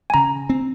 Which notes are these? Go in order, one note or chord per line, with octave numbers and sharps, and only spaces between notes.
G#5
C#3 A#5
C4